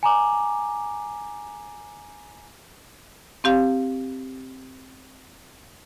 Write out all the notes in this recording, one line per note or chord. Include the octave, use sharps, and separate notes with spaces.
G#5 A#5 D6
C4 G4 F5